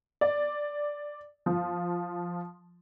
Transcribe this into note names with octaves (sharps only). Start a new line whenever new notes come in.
D5
F3